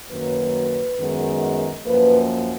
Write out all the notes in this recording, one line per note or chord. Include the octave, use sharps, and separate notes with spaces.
F#2 D#3 F#3 A#3 B4
F#2 D#3 G#3 B3
F#2 F3 A#3 B4